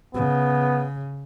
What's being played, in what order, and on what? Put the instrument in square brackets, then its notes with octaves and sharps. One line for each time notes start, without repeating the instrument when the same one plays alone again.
[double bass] C#3 [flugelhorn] B3